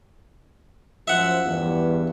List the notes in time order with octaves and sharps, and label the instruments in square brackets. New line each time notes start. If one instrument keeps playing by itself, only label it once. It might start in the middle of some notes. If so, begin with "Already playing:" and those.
[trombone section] F#2 F3 [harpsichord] E5 F#5
[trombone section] E2 G2